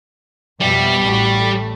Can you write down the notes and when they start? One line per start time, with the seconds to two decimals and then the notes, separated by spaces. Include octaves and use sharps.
0.61 F2 B2 G3 E5
1.06 A1 F#4 B6
1.41 A3